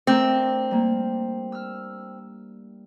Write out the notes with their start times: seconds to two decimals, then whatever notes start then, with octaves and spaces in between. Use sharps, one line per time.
0.07 A3 C4 D4 A#4
0.71 G3 A#3
1.52 E6 F6